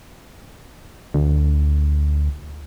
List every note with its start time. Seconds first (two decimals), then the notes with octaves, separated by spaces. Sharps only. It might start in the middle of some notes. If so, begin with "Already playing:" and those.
1.14 D2